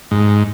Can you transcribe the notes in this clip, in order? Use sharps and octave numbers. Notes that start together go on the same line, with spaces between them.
G#2